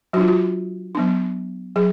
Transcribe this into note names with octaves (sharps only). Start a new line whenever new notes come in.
F#3 D4 F4 F#4
F#4
F#3 B3 D4
F#3 G#4